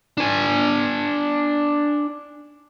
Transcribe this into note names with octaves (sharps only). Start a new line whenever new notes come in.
D4 G#5